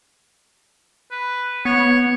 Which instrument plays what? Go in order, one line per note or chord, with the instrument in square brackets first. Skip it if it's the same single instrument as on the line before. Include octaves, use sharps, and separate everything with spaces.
[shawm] B4
[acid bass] B3 [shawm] C#5